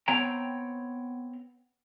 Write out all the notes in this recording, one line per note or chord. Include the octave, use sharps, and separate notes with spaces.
B3 C4 C#5 G5 A#5